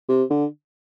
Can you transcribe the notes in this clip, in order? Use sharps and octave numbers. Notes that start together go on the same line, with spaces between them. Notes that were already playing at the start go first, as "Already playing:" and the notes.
C3
D3